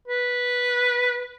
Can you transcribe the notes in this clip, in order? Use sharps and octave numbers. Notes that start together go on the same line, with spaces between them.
B4